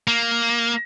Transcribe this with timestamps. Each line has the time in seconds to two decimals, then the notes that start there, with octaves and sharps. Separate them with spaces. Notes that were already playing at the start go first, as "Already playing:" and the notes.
0.08 A#3